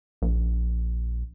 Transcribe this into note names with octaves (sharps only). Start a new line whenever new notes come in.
A#1